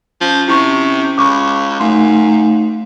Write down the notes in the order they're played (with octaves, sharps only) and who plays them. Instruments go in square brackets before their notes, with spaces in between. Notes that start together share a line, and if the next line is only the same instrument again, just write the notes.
[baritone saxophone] F3 [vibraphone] C#4
[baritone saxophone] C3 [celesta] E4 C#6
[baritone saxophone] C#2 [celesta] B5 C#6 D6
[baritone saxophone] F#2 [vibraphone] A3 D#4 F5 [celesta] C6